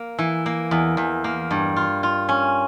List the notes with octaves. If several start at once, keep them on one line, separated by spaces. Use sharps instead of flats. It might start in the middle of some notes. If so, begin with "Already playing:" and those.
Already playing: A#3
E3
A#3
E2
E2
A#3
G2
F4
F4
C#4